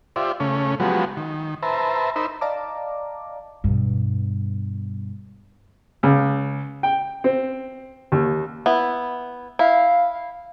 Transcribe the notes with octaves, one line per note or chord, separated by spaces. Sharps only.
F4 G4 C5 D5 E5
C#3 A3 C#4
F3 F#3 G#3 B3 F#4 G4
D#3
B4 C5 E5 A5 A#5
D#4 A#4 C5 B5 E6
D5 D#5 F5 A5 A#5 D6
G2 B2
C#2
G5
C4
D#2
B3 E4
E4 F5